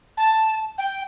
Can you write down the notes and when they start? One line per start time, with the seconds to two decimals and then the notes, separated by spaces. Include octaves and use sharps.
0.17 A5
0.78 G5